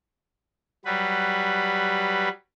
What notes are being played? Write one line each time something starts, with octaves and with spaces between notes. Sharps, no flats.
F#3 G3 B4